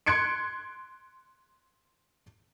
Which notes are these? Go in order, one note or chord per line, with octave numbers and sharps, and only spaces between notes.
C6 F#6 G#6 C#7 D7